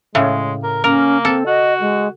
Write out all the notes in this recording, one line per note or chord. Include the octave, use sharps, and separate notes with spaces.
A2 C#3 G#3
A#4
A#3 C#4 A#4
C4 A4
F#4 D#5
G#3